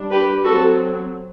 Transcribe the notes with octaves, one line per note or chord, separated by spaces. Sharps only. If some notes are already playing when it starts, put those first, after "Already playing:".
Already playing: G3 D4
G4 B4
F#3 C4 F#4 A4